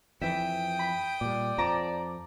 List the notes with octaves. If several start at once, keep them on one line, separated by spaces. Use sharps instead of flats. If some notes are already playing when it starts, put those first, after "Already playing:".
F2 E3 E5 G5 D#6
B5
A#2 G3 D5
F2 F3 A5 A#5 D6